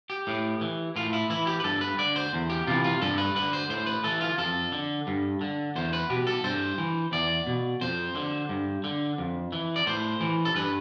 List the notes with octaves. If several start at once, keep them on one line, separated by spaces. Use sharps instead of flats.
G4
A2
E3
A2 F4
E4
E3 E4
G4
B4
G2 A4
B4
D3 D5
C5
E2
G4
C3 E3 F4
F4
G2 A4
B4
D3 B4
C5
A2 C5
B4
E3 A4
F4
F2 A4
D3
G2
D3
E2 C5
B4
B2 G4
A4
G2 C5
E3
E2 D5
B2
F2 C5
D3
G2
D3
F2
E3
D5
A2 C5
E3
A4
G2 B4